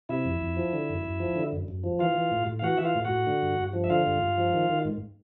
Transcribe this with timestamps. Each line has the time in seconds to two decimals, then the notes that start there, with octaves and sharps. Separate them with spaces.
0.09 C3 E4 E5
0.25 F2
0.41 F2
0.57 F3
0.73 D3
0.89 F#2
1.05 F#2
1.20 F3
1.36 D3
1.52 F#2
1.68 F#2
1.84 F3
1.99 E3 F4 F5
2.16 E3
2.31 A2
2.47 A2
2.59 F5
2.62 E3 F#4 F#5
2.77 E3 E5
2.85 F4 F5
2.95 A2
3.05 F#4 F#5
3.10 A2
3.26 D3
3.42 G2
3.58 G2
3.73 F3
3.84 E5
3.90 D3 F4 F5
4.06 G2
4.21 G2
4.38 F3
4.53 D#3
4.70 D#3
4.85 G#2